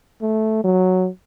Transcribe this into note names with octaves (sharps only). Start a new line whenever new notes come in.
A3
F#3